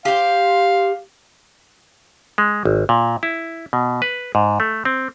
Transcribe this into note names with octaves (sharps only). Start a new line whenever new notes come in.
G4 C5 F5
G#3
G#1
A#2
E4
B2
B4
G#2
A3
C4